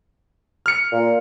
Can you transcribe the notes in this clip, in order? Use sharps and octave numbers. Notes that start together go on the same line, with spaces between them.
F6 C#7
A#2